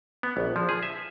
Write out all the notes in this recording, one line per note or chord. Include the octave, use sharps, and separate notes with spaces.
B3
A#1
F3
G#4
E5